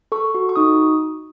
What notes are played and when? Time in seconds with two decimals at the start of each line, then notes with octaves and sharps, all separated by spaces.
0.12 A4 C#6
0.35 F#4
0.49 C#6
0.56 D#4 D#6